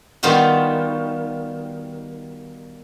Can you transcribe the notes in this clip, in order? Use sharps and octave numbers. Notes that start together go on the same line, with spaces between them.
D#3 G3 B3 F4 F#4